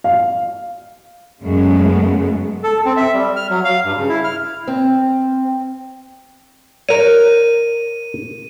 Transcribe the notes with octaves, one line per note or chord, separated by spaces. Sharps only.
F5
F#2 C#3 G#3 A3 B3
A4
C4
E5
G3
F6
F#3
F5
G2
C#3
E4
F6
C4
A#4 C#5 D#7